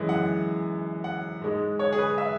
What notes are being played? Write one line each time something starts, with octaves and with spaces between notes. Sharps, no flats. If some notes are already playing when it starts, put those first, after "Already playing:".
Already playing: F#2 E3 G#3
F#5
F#5
G#2 G#3
C#5
G#4
B4
E5